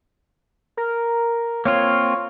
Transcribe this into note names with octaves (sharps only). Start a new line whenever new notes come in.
A#4
A#3 C4 F4 C#5